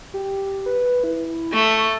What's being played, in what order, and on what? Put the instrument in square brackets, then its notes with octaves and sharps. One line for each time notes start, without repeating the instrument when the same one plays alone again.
[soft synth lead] G4
B4
E4
[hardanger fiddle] A3 [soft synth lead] C#6